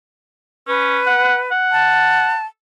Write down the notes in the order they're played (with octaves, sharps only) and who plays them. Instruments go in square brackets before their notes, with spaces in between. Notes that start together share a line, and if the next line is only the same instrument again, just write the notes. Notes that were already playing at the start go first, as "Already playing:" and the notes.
[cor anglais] C#4 [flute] B4
[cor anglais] F#5
F#5
[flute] A5